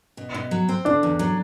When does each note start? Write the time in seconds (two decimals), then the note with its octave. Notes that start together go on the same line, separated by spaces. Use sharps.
0.17 B2
0.34 B2
0.51 F#3
0.69 C4
0.85 D3 D4
1.03 E2
1.19 F#3